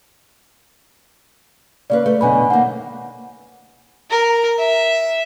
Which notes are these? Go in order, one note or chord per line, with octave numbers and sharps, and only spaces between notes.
C#3 A#3 B4 D5
A3
F#2 B2 D3 G#5 B5
D#3 A#3 F#5
A#4
E5